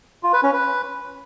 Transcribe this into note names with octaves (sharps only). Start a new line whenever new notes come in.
F4
B4
C#4
B4